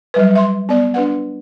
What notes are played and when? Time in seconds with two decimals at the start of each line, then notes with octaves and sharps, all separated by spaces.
0.14 F#3 G3 B4
0.35 E5 C6
0.69 B3 D5
0.94 D4 B4 F#5